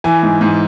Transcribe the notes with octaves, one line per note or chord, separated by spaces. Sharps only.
E3 G#5
G#2
G#2